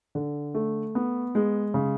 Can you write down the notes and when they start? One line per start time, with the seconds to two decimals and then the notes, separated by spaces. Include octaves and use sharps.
0.15 D3
0.55 A3
0.95 B3
1.35 G#3
1.74 C#3